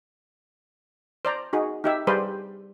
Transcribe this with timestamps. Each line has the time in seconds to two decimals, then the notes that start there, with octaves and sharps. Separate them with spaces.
1.25 C5 D5 A#5
1.53 D#4 F#4 G#4
1.84 D#4 G4 E5
2.07 G3 G#4 B4 C5 D5